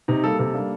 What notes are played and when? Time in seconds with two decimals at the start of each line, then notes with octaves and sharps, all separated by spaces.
0.08 C3 D#4
0.24 G3 A#3 A4
0.39 C3 A4
0.54 G3 A#3 D4